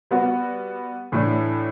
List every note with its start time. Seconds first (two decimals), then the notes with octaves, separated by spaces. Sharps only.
0.11 G3 B3 F#4
1.12 A2 E3 A3 D4